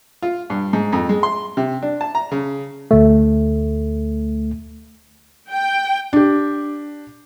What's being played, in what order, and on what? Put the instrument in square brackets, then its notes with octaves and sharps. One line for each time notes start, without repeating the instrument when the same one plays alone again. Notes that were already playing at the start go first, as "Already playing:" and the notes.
[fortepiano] F4
G2
G#2
F2
G#3
C6
C3
D4
A5
A#5
C#3
[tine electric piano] D2 A3
[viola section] G5
[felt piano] D4 G4